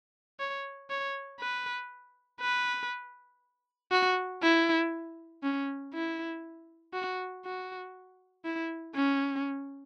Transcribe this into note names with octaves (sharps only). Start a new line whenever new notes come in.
C#5
C#5
B4
B4
F#4
E4
C#4
E4
F#4
F#4
E4
C#4